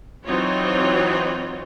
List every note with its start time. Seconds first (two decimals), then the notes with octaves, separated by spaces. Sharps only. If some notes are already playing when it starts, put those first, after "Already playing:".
0.25 E3 F#3 C4 D#4 F4 C#5